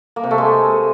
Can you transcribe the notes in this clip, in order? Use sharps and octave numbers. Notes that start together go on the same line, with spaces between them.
A#3
C3
A3
G#3